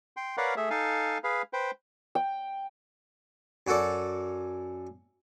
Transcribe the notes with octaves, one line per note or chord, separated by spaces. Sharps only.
G5 C6
A#4 B4 C#5 D5 F5 F#5
A3 G#4 E5
D#4 A4 F5 G#5
G#4 B4 F5
B4 C5 G5
G5
F#2 F#4 A4 D5